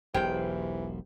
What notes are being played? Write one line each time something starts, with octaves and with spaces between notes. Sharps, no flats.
E1 B1 E3 G4 C5 G5